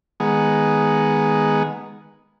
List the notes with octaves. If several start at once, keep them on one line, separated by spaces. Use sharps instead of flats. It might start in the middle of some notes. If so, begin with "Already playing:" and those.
D#3 G#3 B3 G#4 F#5